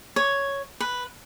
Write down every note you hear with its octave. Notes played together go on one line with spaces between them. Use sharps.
C#5
B4